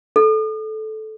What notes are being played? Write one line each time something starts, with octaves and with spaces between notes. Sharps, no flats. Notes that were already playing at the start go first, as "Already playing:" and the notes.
A4